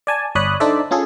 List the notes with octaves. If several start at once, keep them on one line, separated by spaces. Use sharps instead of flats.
D5 G#5 A5
G1 C#5 D5 B5 D#6 F#6
D4 D#4 A4 C5 D5 E5
C#4 F4 G#4 A4